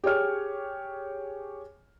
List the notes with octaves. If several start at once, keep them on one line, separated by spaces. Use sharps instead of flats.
G4 G#4 C#5 F6